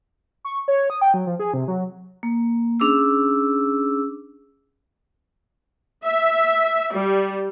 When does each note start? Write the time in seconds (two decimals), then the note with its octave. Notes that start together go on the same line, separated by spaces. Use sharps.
0.45 C#6
0.68 C#5
0.90 D#6
1.01 G5
1.14 F#3
1.27 F3
1.40 G#4
1.54 C3
1.68 F#3
2.23 A#3
2.80 C#4 D4 G#4 D6 E6
6.03 E5
6.93 G3